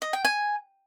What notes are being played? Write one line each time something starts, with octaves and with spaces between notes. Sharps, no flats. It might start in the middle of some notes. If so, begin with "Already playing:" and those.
D#5
G5
G#5